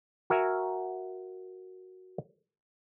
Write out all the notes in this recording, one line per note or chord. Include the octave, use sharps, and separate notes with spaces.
F#4 A#4 E5 G#5